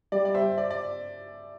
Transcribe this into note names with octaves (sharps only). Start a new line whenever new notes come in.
G3 D5
D5
C5 E5
D5
D5